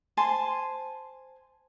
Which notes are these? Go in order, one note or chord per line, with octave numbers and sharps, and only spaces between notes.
C5 G#5 A5 C6